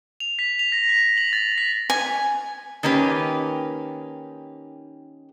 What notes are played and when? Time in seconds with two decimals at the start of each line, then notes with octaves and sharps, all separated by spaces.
0.20 F7
0.39 B6
0.59 F7
0.72 A#6
0.89 B6
1.17 F#7
1.33 A6
1.58 B6
1.90 G#5
2.83 D#3 A#3 C#4 G4 B4